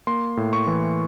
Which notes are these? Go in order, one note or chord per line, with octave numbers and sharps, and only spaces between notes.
A#3 C6
A2
C#6
E3